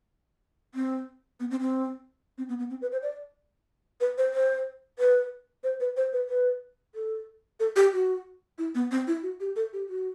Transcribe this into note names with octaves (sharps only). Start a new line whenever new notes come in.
C4
B3
C4
C4
C4
B3
B3
C4
B4
C5
D5
B4
C5
C5
B4
C5
B4
C5
B4
B4
A4
A4
G4
F#4
E4
B3
C4
E4
F#4
G4
A4
G4
F#4